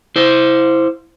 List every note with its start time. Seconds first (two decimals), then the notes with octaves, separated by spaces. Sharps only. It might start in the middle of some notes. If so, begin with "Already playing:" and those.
0.16 E4 C5